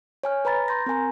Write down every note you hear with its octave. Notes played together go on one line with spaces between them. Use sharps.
C#5 G#5 F6
B4 A#5 B5 A6
C6 G6 A#6
C4 A#4 G#5 A#5